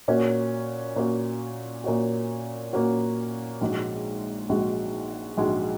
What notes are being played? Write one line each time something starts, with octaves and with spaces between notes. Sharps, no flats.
A#2 A#3 C#4 F#4
A#2 A#3 C#4 F#4
A#2 A#3 C#4 F#4
A#2 A#3 C#4 F#4
A#1 G#2 G#3 F#4
A#1 G#2 G#3 F#4
A#1 G#2 G#3 F#4